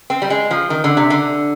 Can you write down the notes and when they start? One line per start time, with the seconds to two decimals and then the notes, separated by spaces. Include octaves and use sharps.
0.10 C4
0.22 G3
0.30 G#3
0.51 F3
0.70 D#3
0.84 D3
0.97 C3
1.10 D3